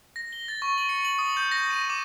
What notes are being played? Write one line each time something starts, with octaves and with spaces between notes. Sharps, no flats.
A#6
G7
A6
C#6
F#7
C#7
F#7
D#6
G6
A#6
D#7
D6